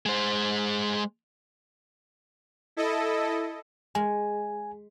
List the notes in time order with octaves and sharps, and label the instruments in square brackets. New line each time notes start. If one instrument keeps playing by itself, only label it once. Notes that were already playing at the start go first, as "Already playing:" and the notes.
[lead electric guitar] G#3 C5
[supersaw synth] E4 A4 D#5
[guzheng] G#3 [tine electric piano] G#5